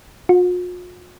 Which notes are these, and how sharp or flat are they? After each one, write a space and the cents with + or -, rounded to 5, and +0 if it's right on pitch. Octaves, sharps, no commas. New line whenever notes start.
F4 +45